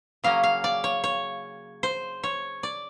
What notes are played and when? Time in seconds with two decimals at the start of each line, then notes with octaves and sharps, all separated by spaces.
0.24 C#3 F#3 A#3 C#4 F5
0.44 F5
0.64 D5
0.84 C#5
1.04 C#5
1.83 C5
2.23 C#5
2.63 D5